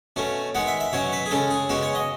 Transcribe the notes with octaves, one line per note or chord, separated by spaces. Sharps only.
B2 A3 C#4
D#3 G#3 B3 F#5
E5
E5
B2 F#3 C#4 C#5
B4
G#4
C#3 G#3 C#4 A4
G#4
C#3 G#3 B3 F#4
C#5
D#5